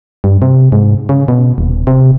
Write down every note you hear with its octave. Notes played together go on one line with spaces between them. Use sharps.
G2
C3
G#2
C#3
B2
D#1
C3